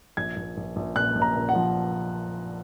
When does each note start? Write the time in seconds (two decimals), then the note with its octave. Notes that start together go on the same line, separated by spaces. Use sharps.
0.17 A#1 G#6
0.36 A#1
0.57 A#1
0.76 A#1
0.96 A#2 F#6
1.15 A#1
1.22 A#5
1.35 A#2
1.49 F#5
1.55 F3